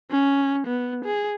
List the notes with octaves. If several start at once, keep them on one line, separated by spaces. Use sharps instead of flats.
C#4
B3
G#4